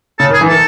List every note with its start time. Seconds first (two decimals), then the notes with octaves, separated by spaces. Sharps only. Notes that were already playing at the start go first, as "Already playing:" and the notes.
0.19 C#3 A4
0.30 D#3
0.34 G#4
0.41 E3
0.48 D#3 A4